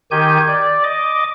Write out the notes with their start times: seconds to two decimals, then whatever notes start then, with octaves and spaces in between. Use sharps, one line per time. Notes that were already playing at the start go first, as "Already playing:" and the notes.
0.11 D#3 G4 G#5 G6
0.48 D5
0.84 D#5 D6